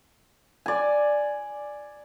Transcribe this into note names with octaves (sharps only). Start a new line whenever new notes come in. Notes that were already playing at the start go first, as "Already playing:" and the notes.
D5 G#5